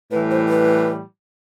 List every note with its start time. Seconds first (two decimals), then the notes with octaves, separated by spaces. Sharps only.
0.11 A2 E3 G3 B4
0.31 C5
0.49 B4